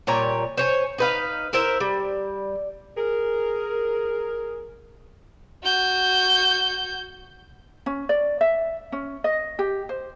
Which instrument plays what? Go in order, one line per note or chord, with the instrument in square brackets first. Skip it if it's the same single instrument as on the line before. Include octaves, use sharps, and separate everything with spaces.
[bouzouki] A#2 G3 C#5 A#5
C5 C#5 G#5
D#4 B4 F5
E4 A#4 C5 E5
G3
[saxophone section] G#4 A#4
[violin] F#4 G6
[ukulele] C#4
D5
E5
C#4
D#5
G4
C5